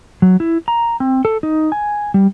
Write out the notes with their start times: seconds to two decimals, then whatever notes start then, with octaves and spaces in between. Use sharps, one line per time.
0.22 F#3
0.40 E4
0.68 A#5
1.00 C4
1.25 A4
1.43 D#4
1.72 G#5
2.14 G3